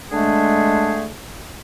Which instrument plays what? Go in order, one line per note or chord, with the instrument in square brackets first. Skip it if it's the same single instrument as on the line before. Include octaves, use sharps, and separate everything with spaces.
[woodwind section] D3 G#3 A3 D4 G#4